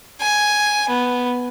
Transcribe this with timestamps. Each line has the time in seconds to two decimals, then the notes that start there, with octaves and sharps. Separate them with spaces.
0.21 G#5
0.89 B3